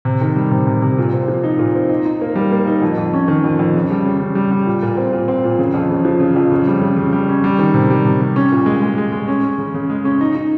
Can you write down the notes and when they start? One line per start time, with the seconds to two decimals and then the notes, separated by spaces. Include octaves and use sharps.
0.05 C3
0.21 D#3
0.36 G3
0.51 C3
0.67 C3
0.82 C3
0.98 A#2
1.13 C4
1.28 F3
1.43 D#4
1.59 A#2
1.75 C4
1.89 D#4
2.06 D#4
2.21 A#3
2.35 G3
2.51 A#3
2.67 D#4
2.82 F2
2.97 F2
3.13 C#4
3.28 D#3
3.44 F2
3.59 F2
3.74 C#3
3.90 G3
4.05 C#3
4.20 C#3
4.35 G3
4.51 G3
4.66 A#2
4.82 A#2
4.97 C4
5.13 A#2
5.28 C4
5.44 A#2
5.59 C#3
5.74 F2
5.90 C#3
6.05 F3
6.20 C#3
6.36 F2
6.52 C#3
6.67 G3
6.81 C#3
6.97 C#3
7.13 G3
7.28 C#4
7.44 G3
7.59 D#3
7.74 C3
7.90 G3
8.05 C3
8.21 G3
8.36 C#4
8.52 A#2
8.66 G#3
8.82 G#3
8.98 G#3
9.12 G#3
9.28 C#4
9.43 C#4
9.58 C#3
9.74 C#3
9.90 G#3
10.05 C#4
10.21 D#4
10.36 D#4